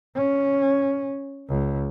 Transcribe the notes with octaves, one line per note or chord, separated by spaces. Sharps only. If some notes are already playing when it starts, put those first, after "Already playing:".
C#4
C#2